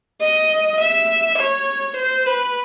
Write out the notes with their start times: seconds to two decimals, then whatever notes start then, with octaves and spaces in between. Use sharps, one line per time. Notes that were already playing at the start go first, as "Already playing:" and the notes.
0.21 D#5
0.80 E5
1.38 C#5
1.97 C5
2.26 B4